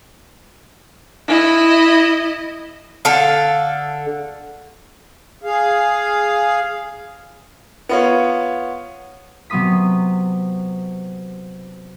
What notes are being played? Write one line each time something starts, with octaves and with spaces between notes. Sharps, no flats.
E4 D#5
D3 A4 F5
G#4 F5
B3 F4 C#5
C3 F#3 B3 C6 D#6 B6